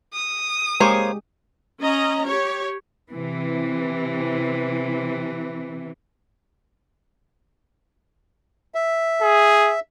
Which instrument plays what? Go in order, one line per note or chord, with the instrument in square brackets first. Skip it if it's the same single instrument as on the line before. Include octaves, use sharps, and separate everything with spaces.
[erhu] D#6
[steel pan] G#3 G4 G#4 [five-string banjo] A#3 C5 C#5
[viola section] C#4 D#5 A#5
G4 C#5
[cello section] C3 E3
[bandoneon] E5
[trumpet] G#4